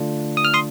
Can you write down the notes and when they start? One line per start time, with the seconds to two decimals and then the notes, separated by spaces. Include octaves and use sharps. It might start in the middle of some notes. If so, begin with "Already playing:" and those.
Already playing: D3 A3 D4 F4
0.37 D#6
0.45 F6
0.54 C6 D#6